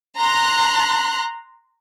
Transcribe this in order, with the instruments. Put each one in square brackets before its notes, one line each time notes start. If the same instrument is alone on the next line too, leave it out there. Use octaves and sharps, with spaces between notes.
[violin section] A#5 C6 F#6